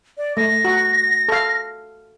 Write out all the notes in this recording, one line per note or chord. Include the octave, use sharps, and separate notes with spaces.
D5
A3 A#6
F#4
A4 F5